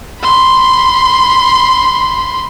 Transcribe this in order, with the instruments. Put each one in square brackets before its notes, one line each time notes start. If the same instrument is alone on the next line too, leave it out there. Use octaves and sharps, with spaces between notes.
[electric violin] B5 C6